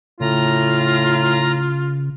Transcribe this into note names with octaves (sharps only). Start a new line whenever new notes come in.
A2 C#3 F4 A#5